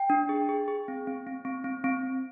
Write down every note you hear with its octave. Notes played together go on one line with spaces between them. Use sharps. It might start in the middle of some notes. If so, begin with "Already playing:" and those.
Already playing: G5
D4
G#4
G#4
G#4
C4
C4
C4
C4
C4
C4